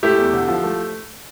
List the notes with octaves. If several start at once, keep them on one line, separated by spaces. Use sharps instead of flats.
A3 E4 G4
E2
D3
F3
A3